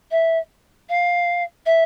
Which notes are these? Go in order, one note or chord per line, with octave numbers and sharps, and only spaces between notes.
E5
F5
E5